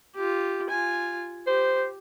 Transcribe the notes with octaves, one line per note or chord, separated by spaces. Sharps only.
F4 G4
F4 G#5
G4 C5